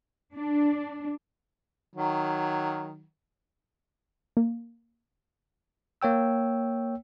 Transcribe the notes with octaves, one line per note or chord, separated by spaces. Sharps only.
D4
D#3 F#3
A#3
A#3 C#5 G5 E6